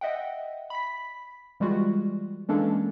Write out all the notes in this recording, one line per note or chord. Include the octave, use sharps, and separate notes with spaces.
D#5 E5 F#5 G5
B5 B6
E3 G3 G#3 F4 F#4
E3 G#3 A#3 C#4 D4 A4